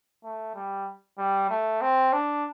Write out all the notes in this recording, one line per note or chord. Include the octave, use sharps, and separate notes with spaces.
A3
G3
G3
A3
C4
D4